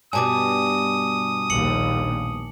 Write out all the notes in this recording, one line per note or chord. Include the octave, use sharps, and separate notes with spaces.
G2 B2 G3 G#5 A5 D6 D#6
A#1 D#2 C#7 F#7